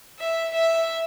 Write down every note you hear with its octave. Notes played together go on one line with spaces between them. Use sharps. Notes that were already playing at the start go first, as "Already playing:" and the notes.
E5
E5